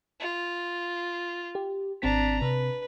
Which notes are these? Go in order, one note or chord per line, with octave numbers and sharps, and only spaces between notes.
F4
G4
G#1 C4 D4 A#5 B6
C3 B4